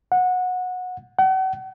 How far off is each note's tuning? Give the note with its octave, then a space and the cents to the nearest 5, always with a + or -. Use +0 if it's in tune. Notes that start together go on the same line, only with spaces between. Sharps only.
F#5 -20
F#5 +40